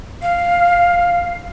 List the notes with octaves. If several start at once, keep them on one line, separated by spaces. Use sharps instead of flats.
F5